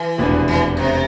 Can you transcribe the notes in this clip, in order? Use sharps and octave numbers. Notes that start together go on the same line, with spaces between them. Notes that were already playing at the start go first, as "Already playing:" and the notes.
Already playing: E3
F1 E2 B2 B3 D4
E3
C3